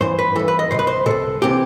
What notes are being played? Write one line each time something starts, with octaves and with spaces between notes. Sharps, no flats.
G2 E3 C5
B4
G2 E3 A4
B4
D#5
B2 C5
C2 B4
C5
C2 B2 A4
C3 E3 G4